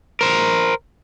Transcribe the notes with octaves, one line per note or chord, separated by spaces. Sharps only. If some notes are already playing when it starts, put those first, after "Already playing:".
A#4 C5